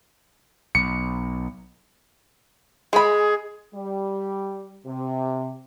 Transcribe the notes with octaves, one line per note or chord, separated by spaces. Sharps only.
B1 C#7
G#3 G#4 B5
G3
C3